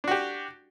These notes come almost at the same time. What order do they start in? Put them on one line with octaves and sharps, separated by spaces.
D4 F#4 G4